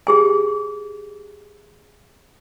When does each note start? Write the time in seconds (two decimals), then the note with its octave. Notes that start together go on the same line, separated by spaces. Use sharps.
0.07 G4 G#4 G#5